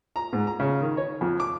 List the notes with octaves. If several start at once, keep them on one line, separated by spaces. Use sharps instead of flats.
A#5
G#2
A#5
C#3
D#3
C#5
F2
D6